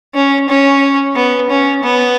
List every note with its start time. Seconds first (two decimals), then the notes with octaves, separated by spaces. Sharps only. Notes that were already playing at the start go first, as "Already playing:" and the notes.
0.15 C#4
0.49 C#4
1.16 B3
1.50 C#4
1.83 B3